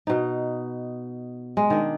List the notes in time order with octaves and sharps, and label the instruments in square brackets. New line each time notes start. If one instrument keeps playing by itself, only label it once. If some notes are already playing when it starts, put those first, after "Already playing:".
[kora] B2 D#4
G#3
D#3 D4